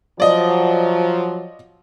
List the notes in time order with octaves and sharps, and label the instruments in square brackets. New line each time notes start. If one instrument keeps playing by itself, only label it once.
[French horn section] F3 F#3 [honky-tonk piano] D5 D#5